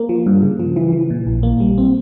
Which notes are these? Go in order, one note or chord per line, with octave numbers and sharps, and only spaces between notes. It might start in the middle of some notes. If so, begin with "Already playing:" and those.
Already playing: A#3
F3
G2
C#3
F3
E3
E3
A#2
A#1
A#3
G3
C4